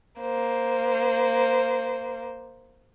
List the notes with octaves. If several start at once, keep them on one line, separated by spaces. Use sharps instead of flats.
A#3 C5